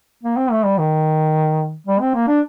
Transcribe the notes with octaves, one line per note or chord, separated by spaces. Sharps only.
A#3
C4
A3
G3
D#3
G3
C4
A#3
D4